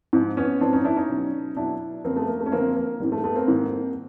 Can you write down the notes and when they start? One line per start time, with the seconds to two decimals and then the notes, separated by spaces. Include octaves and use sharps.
0.13 G#2 F3
0.37 B3 C#4
0.61 G#2 F3 C4 D4
0.73 C#4 D#4
0.84 D4 E4
0.96 C#4 D#4
1.09 B2 F#3
1.56 B2 F#3 D4 E4
2.04 F#2 D3 F3 A#3 C4
2.16 A3 B3
2.28 A#3
2.40 A3 B3
2.46 C#4
2.52 F#2 D3 F3 A#3 C4
2.76 A#3
3.00 G#2 D#3 G3
3.12 A3
3.24 A3 B3
3.36 A#3 C4
3.48 G#2 D#3 G3